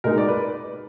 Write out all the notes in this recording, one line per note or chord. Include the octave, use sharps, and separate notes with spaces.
B2 G#3 D#4 A#4
D5
B4